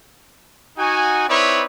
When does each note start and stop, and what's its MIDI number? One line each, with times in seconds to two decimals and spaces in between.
0.78 1.26 63
0.78 1.26 66
0.78 1.26 80
1.28 1.63 60
1.28 1.63 63
1.28 1.63 64
1.28 1.63 71
1.28 1.63 73
1.28 1.63 74